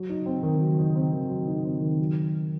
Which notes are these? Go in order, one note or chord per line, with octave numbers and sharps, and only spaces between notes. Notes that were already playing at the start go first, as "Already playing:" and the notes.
Already playing: F#3
D#4
C4
D#3
F#3
D#4
C4
D#3
F#3
D#4
C4
D#3
F#3